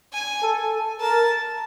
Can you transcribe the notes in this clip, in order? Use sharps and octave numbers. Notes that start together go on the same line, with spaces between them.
G#5
A4
A#4 A5